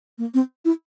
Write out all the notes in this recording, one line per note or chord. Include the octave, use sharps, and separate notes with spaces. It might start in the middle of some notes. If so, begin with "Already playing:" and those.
A#3
C4
E4